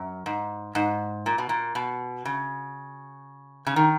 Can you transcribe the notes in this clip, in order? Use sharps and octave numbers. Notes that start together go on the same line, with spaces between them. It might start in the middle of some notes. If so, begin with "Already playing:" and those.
Already playing: F#2
G#2
G#2
A#2
B2
A#2
B2
C#3
C#3
D#3